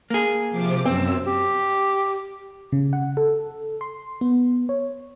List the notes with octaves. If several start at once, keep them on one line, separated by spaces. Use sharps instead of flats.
A#3 G#4
C3 F3 D6
F#2 C4 E6
G4
C#3
F#5
A4
C6
B3
C#5